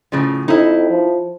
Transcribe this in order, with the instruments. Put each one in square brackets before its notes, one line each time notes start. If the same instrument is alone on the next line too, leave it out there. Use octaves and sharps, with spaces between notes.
[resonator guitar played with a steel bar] A2 C#3 F3
[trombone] F2 [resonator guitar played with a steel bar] D#4 E4
[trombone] F3